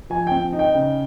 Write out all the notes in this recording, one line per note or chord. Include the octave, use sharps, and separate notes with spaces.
F3 G#5
C4 G5
D#4
G5
C#3